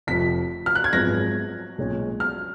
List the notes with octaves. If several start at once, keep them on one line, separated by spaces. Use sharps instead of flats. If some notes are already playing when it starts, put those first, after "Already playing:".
F1 F2 F3 B6
F6
F#6
G#6
G#1 F#2 F3 G#3 B3 A#6
B1 A#2 G#3 C#4
F6